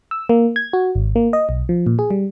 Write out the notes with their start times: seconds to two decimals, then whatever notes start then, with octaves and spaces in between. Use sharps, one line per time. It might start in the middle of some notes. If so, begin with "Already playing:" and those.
0.11 E6
0.29 A#3
0.56 G#6
0.73 F#4
0.95 G#1
1.16 A#3
1.33 D#5
1.49 B1
1.69 F3
1.87 A#2
1.99 G#4
2.11 G3